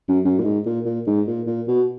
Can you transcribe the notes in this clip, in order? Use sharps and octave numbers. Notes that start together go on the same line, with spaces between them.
F#2
F#2
A#2
G#2
A#2
A#2
G#2
A#2
A#2
B2